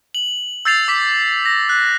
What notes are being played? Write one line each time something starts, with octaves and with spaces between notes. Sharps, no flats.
F#7
E6 G6 A6 C7 F7
D6 B6
A#6
F#6